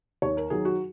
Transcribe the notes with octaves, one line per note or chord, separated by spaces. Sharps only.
D#2 C#5
A#4
D#3 F#3 G#4
F#4